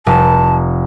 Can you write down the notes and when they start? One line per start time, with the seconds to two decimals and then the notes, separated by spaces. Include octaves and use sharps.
0.07 F1 A5